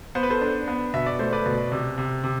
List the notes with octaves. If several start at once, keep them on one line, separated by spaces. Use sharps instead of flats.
B3 C5
B4
A4 C5
D4
B3
B2 E5
D5
A3 C5
B4 D5
B2
C3
C3
C3